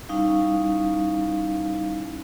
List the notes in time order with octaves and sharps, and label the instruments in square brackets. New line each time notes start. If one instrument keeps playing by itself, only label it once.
[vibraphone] G3 C#4 D#4 E4 F5